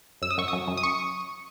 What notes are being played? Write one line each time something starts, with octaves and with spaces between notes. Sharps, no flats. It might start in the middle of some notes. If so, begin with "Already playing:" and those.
F#2 E6
D#6
F#2 C#6
D#6
F#2
F#2
D#6
C#6